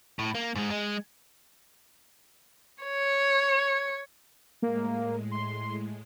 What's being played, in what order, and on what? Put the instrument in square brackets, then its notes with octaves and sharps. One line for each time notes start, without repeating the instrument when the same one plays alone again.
[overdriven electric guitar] A2
A#3
G#2 G#3
G#3
[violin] C#5
[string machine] A2 G#3 [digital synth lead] A#3
[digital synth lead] C6